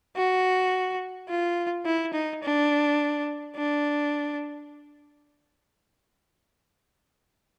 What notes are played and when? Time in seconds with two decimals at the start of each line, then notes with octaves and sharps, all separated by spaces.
0.16 F#4
1.28 F4
1.85 E4
2.13 D#4
2.43 D4
3.56 D4